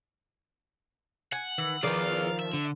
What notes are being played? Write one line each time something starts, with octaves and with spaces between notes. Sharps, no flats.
F#5 G#5
D#3 E3
D#3 F3 G#4 A#4 B4 D5 F5
E5
D3